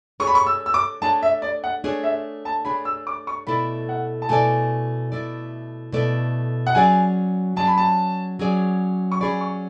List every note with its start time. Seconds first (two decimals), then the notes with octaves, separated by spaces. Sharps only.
0.20 A3 D4 G#4 C#5 C#6
0.27 B5
0.35 C#6
0.47 E6
0.66 E6
0.74 D6
1.02 A3 D4 G#4 C#5 A5
1.23 E5
1.42 D5
1.64 F#5
1.84 A3 D4 G#4 C#5
2.03 E5
2.45 A5
2.65 A3 D4 G#4 C#5 B5
2.85 E6
3.07 D6
3.27 C#6
3.47 B2 A3 E4 A4 D5 B5
3.89 F#5
4.22 A5
4.29 B2 A3 E4 A4 D5 G#5
5.12 B2 A3 E4 A4 D5
5.92 B2 A3 E4 A4 D5
6.67 F#5
6.75 F#3 C#4 G#4 D5 G#5
7.56 F#3 C#4 G#4 D5 A5
7.67 B5
7.78 A5
8.39 F#3 C#4 G#4 D5
9.12 C#6
9.20 F#3 C#4 G#4 D5 B5
9.41 C#6